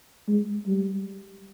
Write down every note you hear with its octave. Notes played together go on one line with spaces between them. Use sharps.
G#3
G3